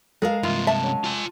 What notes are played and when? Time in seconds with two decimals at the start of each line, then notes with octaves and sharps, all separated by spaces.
0.22 G#3 A4 A#4 F5
0.43 G2 C3 E3 F4
0.67 E5 A5
0.84 F#3 C#4
1.04 F4 G#5